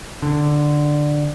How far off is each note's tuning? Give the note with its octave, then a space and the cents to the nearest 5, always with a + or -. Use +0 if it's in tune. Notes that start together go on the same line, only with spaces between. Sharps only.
D3 +10